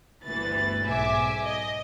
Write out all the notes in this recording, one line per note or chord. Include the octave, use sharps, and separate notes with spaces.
G1 D2 E3 B4 A6
B1 G#2 E5 G#5 D6
D#5